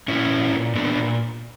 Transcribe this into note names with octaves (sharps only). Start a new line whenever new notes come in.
A#2 C#4 E4
A#2
A#2
A#2 B3 D4
A#2